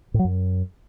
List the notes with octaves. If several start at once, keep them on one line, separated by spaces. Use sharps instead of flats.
A2
F#3
F#2